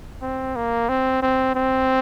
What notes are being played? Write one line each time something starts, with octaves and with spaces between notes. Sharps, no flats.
C4
A#3
C4
C4
C4